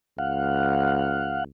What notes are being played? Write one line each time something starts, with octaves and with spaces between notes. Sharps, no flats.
C#2 F5 F#5